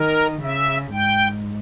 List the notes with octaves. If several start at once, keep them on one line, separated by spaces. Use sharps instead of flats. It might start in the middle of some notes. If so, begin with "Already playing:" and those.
Already playing: D#3 A#4
C#3 E5
G#2 G5